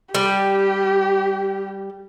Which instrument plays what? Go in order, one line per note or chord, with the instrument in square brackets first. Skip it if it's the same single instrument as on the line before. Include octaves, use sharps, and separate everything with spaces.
[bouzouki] G3 [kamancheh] G4